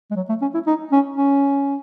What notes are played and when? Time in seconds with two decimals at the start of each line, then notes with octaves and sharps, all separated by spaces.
0.11 G#3
0.16 F#3
0.29 A3
0.41 C#4
0.54 E4
0.66 D#4
0.92 C#4
1.16 C#4